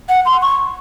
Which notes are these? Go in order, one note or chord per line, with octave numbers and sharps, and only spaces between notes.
F#5
C6
C#6